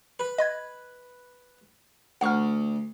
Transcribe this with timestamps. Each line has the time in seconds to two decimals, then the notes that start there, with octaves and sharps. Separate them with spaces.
0.19 B4
0.38 D#5 B5 G#6
2.21 D2 F#5 C#6 F6